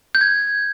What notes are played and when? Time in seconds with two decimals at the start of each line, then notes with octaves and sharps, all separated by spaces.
0.15 G6
0.21 G#6